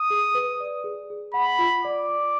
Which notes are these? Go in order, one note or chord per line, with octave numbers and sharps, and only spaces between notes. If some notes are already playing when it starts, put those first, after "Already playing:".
Already playing: D#6
G#4
B4
D5
G#4
G#4
F#5 B5
F4
D5 D6
D5